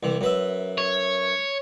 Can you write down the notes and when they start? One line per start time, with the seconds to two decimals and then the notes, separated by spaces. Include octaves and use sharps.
0.03 C2 E3
0.21 F#2 B4 E5
0.78 C#5